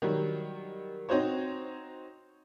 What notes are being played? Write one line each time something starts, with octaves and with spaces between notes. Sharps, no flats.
D#3 F#3 G3
C4 D#4 F#4 C5 C#5